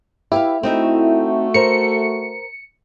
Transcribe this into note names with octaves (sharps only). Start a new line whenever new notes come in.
E4 G4 B4 F5
A3 C4 D#4 F#4 E5
A#4 C5 C#7